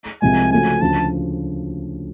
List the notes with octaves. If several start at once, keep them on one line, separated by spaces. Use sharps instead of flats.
C2 C3 F3 G#3 G#5
C#3 F3 A3 C#4 F#4 G#5
D2 C#3 F3 A5